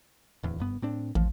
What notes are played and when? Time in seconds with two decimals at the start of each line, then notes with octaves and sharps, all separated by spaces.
0.43 D1 E2
0.59 F#1 G2 B3
0.82 A2 C4 D4
1.15 A1 D#2 F3